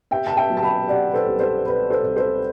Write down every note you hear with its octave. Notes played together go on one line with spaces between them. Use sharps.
C3 E5 G5
A5
E5 G5
F#3
A5
G5 B5
C3 D5 F#5
B4
A4 C5
C2
A4 C5
C3 B4
A4 C5
C2
A4 C5